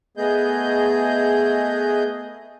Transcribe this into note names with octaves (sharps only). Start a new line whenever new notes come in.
A3 B3 G#4 D#5 G6